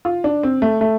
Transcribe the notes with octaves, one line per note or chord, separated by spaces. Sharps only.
F4
D4
C4
A3
A3